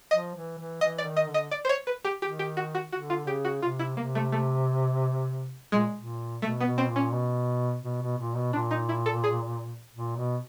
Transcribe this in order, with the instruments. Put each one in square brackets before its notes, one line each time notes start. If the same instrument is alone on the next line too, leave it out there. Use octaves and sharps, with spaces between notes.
[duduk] F3 [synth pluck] D#5
[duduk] E3
E3
[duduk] E3 [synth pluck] D#5
[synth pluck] D5
[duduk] D#3
[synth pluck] D#5
[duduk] D3
[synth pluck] D#5
D5
C5
C#5
B4
G4
[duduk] D#3 [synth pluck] G4
[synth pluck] G4
F#4
F#4
[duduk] D3 [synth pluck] F#4
[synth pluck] F4
[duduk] C#3 [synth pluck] G4
[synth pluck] F#4
[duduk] C3 [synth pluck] F4
[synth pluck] E4
[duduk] C3 [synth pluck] A#3
[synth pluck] A3
A3
[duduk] A#2 [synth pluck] G#3
[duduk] A#2
[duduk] B2 [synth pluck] A3
[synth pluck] B3
[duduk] B2
[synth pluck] C4
[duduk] A#2
[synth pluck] C#4
[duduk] B2
B2
B2
A#2
B2
[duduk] A#2 [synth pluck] D4
[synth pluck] D#4
E4
A4
G#4
[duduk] A#2
B2